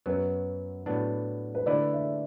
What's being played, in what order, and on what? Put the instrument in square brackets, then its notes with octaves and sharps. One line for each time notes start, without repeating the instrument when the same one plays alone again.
[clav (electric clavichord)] F#2 F#3 B3 [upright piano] B4
[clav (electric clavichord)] A2 F#3 B3 D4
[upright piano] B4
[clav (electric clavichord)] D3 A3 E4 B4 [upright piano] D5
[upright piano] E5